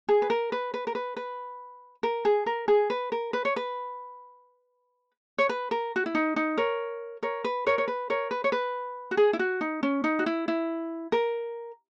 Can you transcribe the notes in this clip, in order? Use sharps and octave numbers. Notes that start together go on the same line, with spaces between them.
G#4
B4
A#4
B4
B4
A#4
B4
B4
A#4
G#4
A#4
G#4
B4
A#4
B4
C#5
B4
C#5
B4
A#4
F#4
E4
D#4
D#4
A#4 C#5
A#4 C#5
B4
A#4 C#5
C#5
B4
A#4 C#5
B4
C#5
B4
F#4
G#4
E4
F#4
D#4
C#4
D#4
F#4
E4
E4
A#4